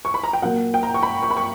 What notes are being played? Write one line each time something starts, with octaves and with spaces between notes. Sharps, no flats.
C#6
B5
A#5
G5
A#2 F#3 A#3 F#5
G5
A#5
C#6
B5
C#6
B5
C#6